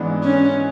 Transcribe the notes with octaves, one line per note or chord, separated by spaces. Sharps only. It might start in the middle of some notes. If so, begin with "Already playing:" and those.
Already playing: G#2 E3 B3 D4 G#4
C#4